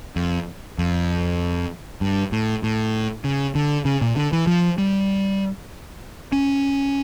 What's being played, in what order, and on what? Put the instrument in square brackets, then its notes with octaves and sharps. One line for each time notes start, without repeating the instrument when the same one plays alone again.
[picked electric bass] F2
F2
G2
A2
A2
C#3
D3
C#3
A#2
D3
E3
F3
G3
C#4